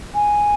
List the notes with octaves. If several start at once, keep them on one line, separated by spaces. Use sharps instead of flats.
G#5